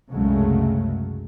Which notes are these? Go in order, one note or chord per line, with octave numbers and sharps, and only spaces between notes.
C2 F#2 C#3 F#3 G#3 A3